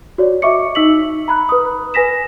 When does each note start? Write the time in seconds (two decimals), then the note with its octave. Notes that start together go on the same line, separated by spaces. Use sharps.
0.18 F#4 C#5 D5
0.42 D#5 E5 C#6 D6 C#7
0.75 D#4 E6 B6 F#7
1.28 A#5 B5 F#6
1.49 B4 D#6
1.94 B4 G#5 A#6 B6 E7